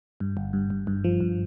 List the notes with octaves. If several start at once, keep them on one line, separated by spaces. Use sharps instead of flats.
G2
G1
G2
G2
G2
F3
G2